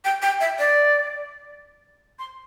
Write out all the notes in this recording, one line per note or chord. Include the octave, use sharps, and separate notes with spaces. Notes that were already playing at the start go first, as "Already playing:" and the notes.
G5
G5
E5
D5
C6